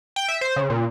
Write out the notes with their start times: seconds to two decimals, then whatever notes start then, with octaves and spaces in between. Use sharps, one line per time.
0.16 G5
0.29 E5
0.41 C5
0.56 C#3
0.70 A#2